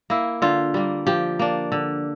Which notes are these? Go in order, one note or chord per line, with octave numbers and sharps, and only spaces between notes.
A#3 E4
D3 F4
G3 A#3
F3 G4
A#3 D4
D3